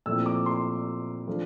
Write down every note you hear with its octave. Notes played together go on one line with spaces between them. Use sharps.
A#2 F3 A3 C4 E4 E6
D6
C6
F3 A3 D4